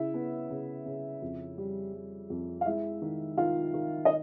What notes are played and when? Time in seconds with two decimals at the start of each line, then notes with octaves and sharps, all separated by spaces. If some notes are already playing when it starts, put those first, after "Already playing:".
Already playing: C#3 E4 E5
0.14 B3
0.50 C#3
0.86 C#3
1.22 F2
1.58 G3
1.94 G3
2.30 F2
2.61 F5
2.66 G#3 E4 E5
3.02 D#3
3.37 D#3 F4 F5
3.74 D#3
4.05 D#5